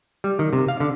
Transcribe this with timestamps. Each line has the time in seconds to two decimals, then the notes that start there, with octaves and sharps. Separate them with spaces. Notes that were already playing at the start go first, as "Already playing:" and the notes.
0.24 G3
0.39 D#3
0.53 C3
0.68 F5
0.80 D3